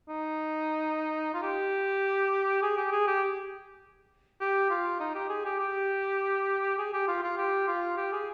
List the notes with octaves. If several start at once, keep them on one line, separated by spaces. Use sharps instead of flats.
D#4
F4
G4
G#4
G4
G#4
G4
G4
F4
D#4
G4
G#4
G4
G4
G#4
G4
F4
F4
G4
F4
G4
G#4